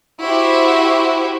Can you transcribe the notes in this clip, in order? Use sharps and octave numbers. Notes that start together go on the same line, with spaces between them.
E4 F#4 G4 C5